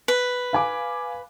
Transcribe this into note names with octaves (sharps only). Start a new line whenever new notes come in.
B4
F5 G#5 D6